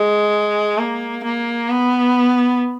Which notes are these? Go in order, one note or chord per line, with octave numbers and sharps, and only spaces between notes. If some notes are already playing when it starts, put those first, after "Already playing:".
Already playing: G#3
A#3
A#3
B3